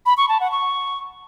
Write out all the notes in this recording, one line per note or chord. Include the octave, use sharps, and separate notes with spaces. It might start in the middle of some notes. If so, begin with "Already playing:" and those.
B5
C#6
A5
F#5
C#6